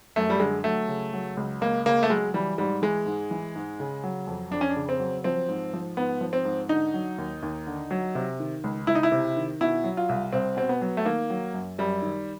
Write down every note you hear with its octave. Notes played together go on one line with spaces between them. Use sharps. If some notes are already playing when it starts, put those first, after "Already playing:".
F#2 A3
G3
D3 G#3
F#3 A3
C#3
F#3
C#2
C#2 A#3
C#3 A#3
A3
F#3 G#3
E3 G3
G#2 G3
E3 G#3
G#2
E3
G#2
C#3
F#3
F2
F2 D4
C#4
D4
C#3
C4
F#3
F3 C4
G#2
F3
G#2 B3
F3
C4
G#2
D3 D#4
F#3
D#2
D#2
D3
F#3
C3
D#3
C#2
C#2 E4
D#4
E4
C3
D#3
B2 E4
F#3
F4
C2
C2 C4
B2 C4
B3
F#3
A3
D#3 A#3
F#3
F#2
F#2 G3
D#3